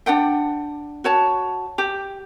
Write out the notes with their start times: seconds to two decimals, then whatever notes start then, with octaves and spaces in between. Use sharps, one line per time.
0.06 D4 D5 F#5 G5
1.04 F#4 C#5 A5
1.78 G4